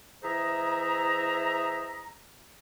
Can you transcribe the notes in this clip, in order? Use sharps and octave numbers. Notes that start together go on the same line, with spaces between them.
E3 G#4 C5 D#5 E5 A#5